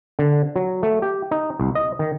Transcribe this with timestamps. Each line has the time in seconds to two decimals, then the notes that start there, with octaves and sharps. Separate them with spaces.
0.19 D3
0.56 F#3
0.83 A3
1.02 G4
1.31 D#4
1.60 C2
1.75 D#5
1.99 D#3